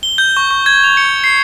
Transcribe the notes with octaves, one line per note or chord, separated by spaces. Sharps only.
G7
G6
C#6
C#6
G#6
F7
C#7
C7